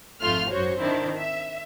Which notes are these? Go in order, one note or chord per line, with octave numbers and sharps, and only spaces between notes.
G#1 F2 A3 F4 C6 F6
F#2 F#4 C5 C#5
D#3 C4 D4 E4
E5